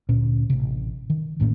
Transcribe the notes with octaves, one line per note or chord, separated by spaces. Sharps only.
D2 A#2 C#4
A1 C3
D#3
A1 A2 A#3 C#4